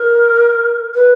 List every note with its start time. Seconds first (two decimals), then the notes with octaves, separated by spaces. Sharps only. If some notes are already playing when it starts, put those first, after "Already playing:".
Already playing: A#4
0.94 B4